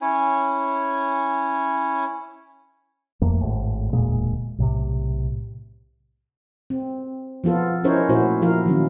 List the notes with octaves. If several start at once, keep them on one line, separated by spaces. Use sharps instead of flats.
C#4 E4 C#5 G#5
G1 F2 A3 A#3
G#1 A2
E1 D2 A#2 G#3
B1 A2 C3
C4
F3 B3 F4 A4
C#4 D#4 E4 A#4 C5 C#5
A#2 A3 E4 F#4 C5
F3 A#3 E4 A#4 F5
D#3 F#3 C#4